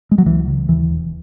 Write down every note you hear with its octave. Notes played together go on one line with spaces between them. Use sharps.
G#3
F#3
C#2 E3
C#3
D#2 E3
E1